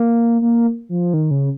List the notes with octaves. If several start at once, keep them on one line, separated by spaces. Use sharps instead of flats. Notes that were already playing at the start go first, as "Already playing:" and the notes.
Already playing: A#3
A#3
F3
D#3
C#3